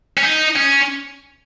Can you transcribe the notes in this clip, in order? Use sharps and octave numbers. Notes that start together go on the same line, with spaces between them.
C#4
D#4
C#4